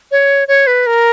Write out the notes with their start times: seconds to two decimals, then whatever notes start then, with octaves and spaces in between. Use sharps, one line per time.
0.11 C#5
0.48 C#5
0.67 B4
0.87 A#4